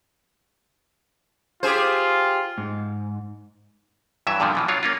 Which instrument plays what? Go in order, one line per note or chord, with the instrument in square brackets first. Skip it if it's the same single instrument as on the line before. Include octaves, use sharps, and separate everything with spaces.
[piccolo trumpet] F4 [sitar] G4 G#4 C5
[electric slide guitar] G#2
[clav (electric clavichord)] G2 E3 F#3 E5
G2 A#2 D3 E3 F3
B2 E3 F3
F#3 D4 F4 C#5
A#3 C#4 F4